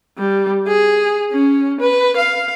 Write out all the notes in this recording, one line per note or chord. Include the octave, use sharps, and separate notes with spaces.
G3
G#4
C#4
B4
F5